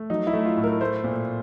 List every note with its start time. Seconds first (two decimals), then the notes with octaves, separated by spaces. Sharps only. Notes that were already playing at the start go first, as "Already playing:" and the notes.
Already playing: A3
0.10 F#3 D#4
0.27 E4
0.33 A3
0.46 F4
0.57 A2
0.64 A#4
0.81 A3 C5
1.04 A#2